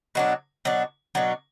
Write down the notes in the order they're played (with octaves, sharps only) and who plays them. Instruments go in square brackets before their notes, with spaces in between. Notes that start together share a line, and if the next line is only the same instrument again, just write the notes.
[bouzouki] B2 F#3 D4
B2 F#3 D4
B2 F#3 D4